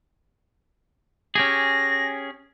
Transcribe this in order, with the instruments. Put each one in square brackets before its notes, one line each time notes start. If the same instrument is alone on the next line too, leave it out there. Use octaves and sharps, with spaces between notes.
[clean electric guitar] C#4 G4 G#4 [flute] A#6